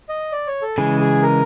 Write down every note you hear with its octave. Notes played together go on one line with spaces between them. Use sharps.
D#5
D5
C#5
A4
C#3 E3 G#3 G#4
G#4
A#4